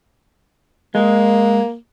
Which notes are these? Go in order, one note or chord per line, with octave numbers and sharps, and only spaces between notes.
G#3 A#3